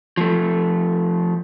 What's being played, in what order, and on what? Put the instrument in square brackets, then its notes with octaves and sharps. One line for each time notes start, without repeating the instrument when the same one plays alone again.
[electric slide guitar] F3 A3